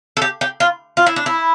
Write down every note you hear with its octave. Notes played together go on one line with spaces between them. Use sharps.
A4
G4
G4
F4
F4
E4
D4
E4